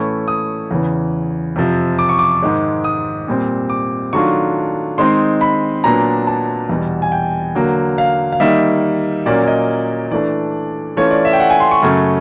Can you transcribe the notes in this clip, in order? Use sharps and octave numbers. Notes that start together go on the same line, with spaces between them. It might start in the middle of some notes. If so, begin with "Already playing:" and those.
Already playing: A2 E3 A3 C#4 E4 C#6
D#6
E2 C#3 E3
F2 C3 F3
D6
C#6
D6
G#2 D#3 G#3
D#6
A#2 G3 C4
D6
D#3 F#3 A3 D4 F4 C#6
D#3 G#3 C4 D#4 C6
B5
A#2 F#3 B3 D4 A#5
A5
E2 B2 G3
G#5
G5
D3 F#3 A#3
F5
F5
D#3 G3 A#3 D#4 E5
A#2 F#3 A#3 C#4 D5
D#5
E3 A3 D4 D5
E3 A3 C#4 F4 C#5
D5
E5
G5
F#5
G#5
C6
C#6
F#2 C#3 F#3 A3 C#4